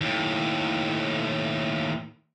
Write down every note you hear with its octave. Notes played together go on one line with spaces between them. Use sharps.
D#2 A2